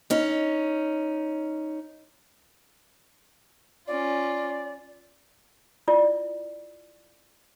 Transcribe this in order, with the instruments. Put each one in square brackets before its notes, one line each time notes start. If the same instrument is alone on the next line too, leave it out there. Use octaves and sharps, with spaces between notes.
[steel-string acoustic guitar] C#4 D#4
[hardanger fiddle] C#4 F4 [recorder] D5
[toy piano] E4 F4 D5